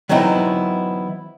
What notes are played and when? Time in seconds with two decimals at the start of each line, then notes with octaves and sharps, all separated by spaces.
0.09 E3 F#3 B3 C4 D#4 E4